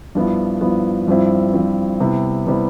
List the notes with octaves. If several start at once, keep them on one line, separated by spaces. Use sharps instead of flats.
G2 F3 B3 E4
G2 F3 B3 E4
G2 F3 C4 E4
G2 F3 C4 E4
C3 G3 B3 E4
C3 G3 B3 E4